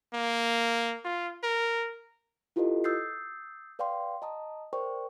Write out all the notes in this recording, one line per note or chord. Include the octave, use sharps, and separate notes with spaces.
A#3
F4
A#4
E4 F4 G4 A4 B4 D#5
D#6 E6 G6 A6 C7
B4 D5 F5 G5 C6
D#5 A5 A#5 D#6
A#4 C5 D5 G5 C#6